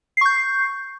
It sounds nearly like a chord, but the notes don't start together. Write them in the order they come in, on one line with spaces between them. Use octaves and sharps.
C7 C#6 G6